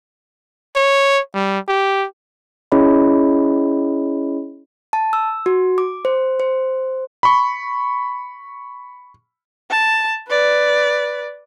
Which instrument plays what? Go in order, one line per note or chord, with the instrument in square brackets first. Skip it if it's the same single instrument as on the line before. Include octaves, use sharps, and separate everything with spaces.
[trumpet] C#5
G3
G4
[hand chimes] C#4 E4 G#4 C#5 D#5 B5
A5
E6
F#4
D6
C5
C5
[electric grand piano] B5 C#6
[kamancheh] A5
B4 D5